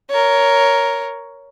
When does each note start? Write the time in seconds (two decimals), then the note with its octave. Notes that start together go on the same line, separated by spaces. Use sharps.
0.10 A#4 C#5